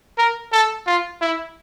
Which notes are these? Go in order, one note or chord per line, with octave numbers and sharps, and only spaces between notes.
A#4
A4
F4
E4